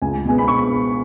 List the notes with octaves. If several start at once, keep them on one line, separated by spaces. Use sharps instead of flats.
C#2 G#5
B2 G#3 B3 G#5
B5
C#6